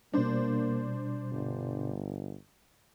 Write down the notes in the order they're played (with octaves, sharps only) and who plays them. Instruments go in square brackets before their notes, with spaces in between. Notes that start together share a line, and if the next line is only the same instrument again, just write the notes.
[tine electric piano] B2 G3 [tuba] A#3 [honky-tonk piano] D4 C5
[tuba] G1